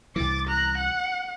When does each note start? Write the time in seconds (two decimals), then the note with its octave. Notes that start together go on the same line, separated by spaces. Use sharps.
0.16 C2 E3 D6 A6
0.48 A#5 F#6
0.78 F#5